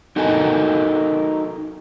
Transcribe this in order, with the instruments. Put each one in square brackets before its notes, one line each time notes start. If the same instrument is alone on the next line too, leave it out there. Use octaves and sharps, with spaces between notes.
[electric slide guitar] D#4 F#4 A4 A#4 D#5 G#5